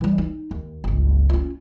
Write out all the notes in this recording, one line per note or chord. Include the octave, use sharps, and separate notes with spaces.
E3 G3
D#4
D#2
G1 C#2
C#4 F4